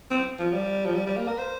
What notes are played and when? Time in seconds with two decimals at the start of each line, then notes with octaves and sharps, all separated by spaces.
0.11 C4
0.39 F3
0.53 G3
0.85 F3
0.95 G3
1.06 G3
1.17 A#3
1.28 A#4
1.39 C5